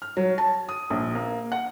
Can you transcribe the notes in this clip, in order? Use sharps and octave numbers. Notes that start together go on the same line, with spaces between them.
F6
F#3
A5
D#6
A#1
A#3
F#5